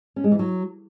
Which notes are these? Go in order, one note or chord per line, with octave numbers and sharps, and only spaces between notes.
C#4
G#3
E3
F#3